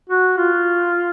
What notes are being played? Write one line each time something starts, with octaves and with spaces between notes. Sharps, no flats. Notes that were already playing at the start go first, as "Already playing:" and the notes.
F#4
F4